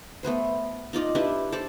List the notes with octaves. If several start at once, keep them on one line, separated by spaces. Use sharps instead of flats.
A3 B3 B4 C5
D#4 F4 D5 D#5
D4 E4 G4 B4
A4 C5 D5 A5